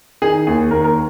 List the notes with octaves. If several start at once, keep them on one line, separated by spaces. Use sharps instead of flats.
D#3 G#4
D#2 G#4
D#2 A#4
A#4